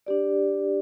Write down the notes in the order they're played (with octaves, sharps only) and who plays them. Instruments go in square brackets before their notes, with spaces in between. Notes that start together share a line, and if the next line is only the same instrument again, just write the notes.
[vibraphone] D4 G4 D5